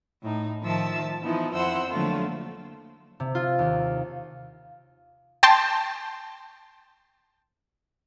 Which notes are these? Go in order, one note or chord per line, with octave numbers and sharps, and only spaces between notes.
A2 D#4
D#3 F3 E5 A5 E6
E3 F3 B3 D#4 E4
F2 C4 E4 C5 F#5 E6
D3 F3 F#3 A3 A#3 F4
C3
F4
D#2
G5 A5 C6